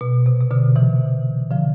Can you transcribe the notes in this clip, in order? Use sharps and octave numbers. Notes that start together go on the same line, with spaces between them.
B2
C3
C3
B2 D3
C3 E3
D3 F3